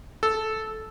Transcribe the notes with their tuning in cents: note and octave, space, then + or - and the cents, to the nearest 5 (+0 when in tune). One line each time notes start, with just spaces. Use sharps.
A4 -10